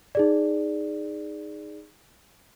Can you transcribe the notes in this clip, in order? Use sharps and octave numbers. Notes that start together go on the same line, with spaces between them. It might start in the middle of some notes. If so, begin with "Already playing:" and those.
D#4 G#4 D5